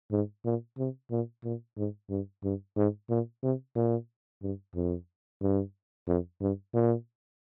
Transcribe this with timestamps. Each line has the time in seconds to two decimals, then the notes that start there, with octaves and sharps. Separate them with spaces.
0.11 G#2
0.45 A#2
0.78 C3
1.11 A#2
1.44 A#2
1.77 G#2
2.10 G2
2.43 G2
2.77 G#2
3.10 A#2
3.43 C3
3.75 A#2
4.42 G2
4.75 F2
5.41 G2
6.07 F2
6.41 G2
6.74 A#2